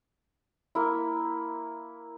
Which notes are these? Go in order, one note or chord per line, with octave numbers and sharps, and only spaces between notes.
A#3 E4